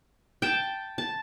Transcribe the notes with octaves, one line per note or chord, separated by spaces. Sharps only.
G5 A5
A5